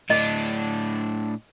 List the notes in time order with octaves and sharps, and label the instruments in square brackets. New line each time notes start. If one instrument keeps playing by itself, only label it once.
[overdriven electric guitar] A2 D4 [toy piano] D#5